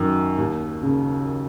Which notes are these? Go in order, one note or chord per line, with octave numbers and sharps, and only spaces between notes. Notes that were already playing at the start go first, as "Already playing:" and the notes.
Already playing: F#2 D#3
D#2
C#3